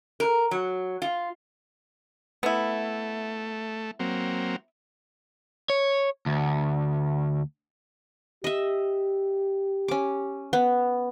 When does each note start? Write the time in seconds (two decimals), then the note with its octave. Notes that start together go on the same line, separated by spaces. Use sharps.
0.20 A#4
0.51 F#3
1.02 F4
2.43 A3 B3 E4
3.99 F#3 A#3 C4
5.70 C#5
6.26 D2
8.44 G4 D#5 E5
9.88 C#4 D6
10.53 B3